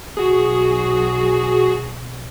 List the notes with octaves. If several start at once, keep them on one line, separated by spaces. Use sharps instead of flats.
B1 F#4 G#4